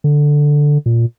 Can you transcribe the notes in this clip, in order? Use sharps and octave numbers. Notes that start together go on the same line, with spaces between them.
D3
A#2